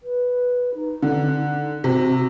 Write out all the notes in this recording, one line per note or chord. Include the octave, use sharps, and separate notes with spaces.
B4
D#4
D3
C3 F#4